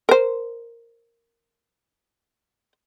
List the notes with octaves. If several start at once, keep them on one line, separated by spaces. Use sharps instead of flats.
A#4 C5